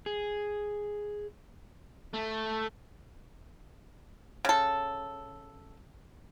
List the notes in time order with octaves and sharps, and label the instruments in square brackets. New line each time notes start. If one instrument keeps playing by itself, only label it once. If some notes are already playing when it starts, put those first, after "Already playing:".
[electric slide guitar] G#4
[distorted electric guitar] A3
[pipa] C#3 A4